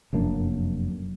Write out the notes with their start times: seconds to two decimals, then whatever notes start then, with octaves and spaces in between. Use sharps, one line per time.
0.13 F1 F#2 A#3 D4